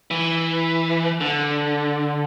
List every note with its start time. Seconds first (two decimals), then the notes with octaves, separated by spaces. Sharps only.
0.11 E3
1.21 D3